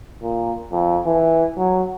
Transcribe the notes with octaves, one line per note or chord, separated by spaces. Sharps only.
A#2
F2
E3
F#3